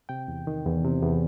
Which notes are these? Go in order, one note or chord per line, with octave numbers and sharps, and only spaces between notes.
C3 G5
E2
D#3
E2
C3
E2